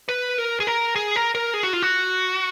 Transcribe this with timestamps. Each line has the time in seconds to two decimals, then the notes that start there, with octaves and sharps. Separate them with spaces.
0.09 B4
0.38 A#4
0.60 G#4
0.67 A#4
0.96 G#4
1.16 A#4
1.35 A#4
1.54 G#4
1.63 F#4
1.73 F4
1.82 F#4